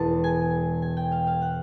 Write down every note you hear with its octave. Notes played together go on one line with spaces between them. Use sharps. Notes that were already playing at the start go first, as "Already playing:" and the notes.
Already playing: E1 E2 B2 G#3 B3 A5
G#5
G#5
G5
F5
F5
F#5